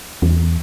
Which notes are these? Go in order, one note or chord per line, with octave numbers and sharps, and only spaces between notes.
E2